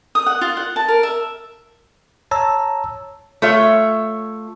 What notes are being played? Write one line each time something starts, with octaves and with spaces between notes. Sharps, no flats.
D#6
F#5
F4
F#5
A5
A#4
E5
C#5 A5 A#5 E6
A3 F4 C#5 E5